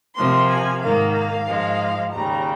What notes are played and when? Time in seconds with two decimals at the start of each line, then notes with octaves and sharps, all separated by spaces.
0.16 C3 F3 A#3 C6
0.48 G#5
0.81 G#2 D#3 A#3 F5
1.14 F5
1.47 G#2 F3 G#3
2.12 D#2 C#3 G3 A#5